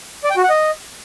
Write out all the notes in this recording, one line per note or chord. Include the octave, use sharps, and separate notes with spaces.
D5
G5
F#4
F#5
D#5